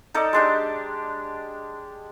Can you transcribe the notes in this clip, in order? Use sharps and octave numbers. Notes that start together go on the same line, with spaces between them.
D#4 A4 D5
G#3 D4 G4